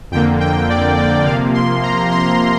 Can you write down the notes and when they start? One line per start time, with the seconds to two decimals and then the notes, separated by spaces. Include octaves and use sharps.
0.11 F2 D3 A#3 G5
0.40 G5
0.70 D5
0.97 D5
1.26 C3 F3 A#3 F5
1.54 C6
1.83 A#5
2.11 C6